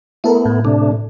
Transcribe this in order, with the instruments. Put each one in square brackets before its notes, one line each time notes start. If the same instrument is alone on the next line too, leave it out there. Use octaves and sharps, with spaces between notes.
[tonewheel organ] A3 B3 [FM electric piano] E4 A4 A#4
[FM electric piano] A2
[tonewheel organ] C3 A3 D4